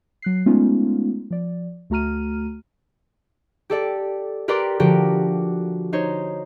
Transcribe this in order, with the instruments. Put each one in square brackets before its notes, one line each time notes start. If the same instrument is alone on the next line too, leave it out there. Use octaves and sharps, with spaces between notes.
[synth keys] F#3 F#6 C7
G#3 A3 B3 C#4 D#4 F4
F3 D5
D2 A3 F#4 A#5 F6 D#7
[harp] G4 A4 D5
G4 A#4 B4 D5 C6 D6
D3 F3 F#4 G4 A#4
D#4 C5 C#5